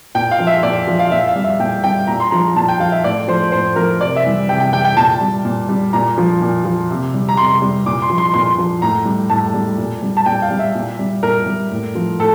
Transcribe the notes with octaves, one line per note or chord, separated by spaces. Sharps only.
A#2 G5
F5
F3
E5
A#2 D5
F3
F5
A#2 E5
F5
G3
E5
A#2 G5
G3 G5
A#2 A#5
C6
F3 A#5
A#2 A5
G5
F3 F5
E5
A2 D5
F3 C5
A2 C5
F3 A#4
C3 D5
E5
E3 G3
C3 G5
G5
E3 G3 G5
G5
A#2 A5
G3
A#2
G3
A#2 A#5
F3
A#2
F3
C3
G3
A#5
C3 C6
G3
A#2 D6
C6
F3
C6
A#2 C6
F3
A2 A#5
G3
A2 A5
G3
A#2
G3
A5
A#2 G5
F5
G3
E5
A#2
G3
A#2 A#4
G3
A2
F3
A2 A4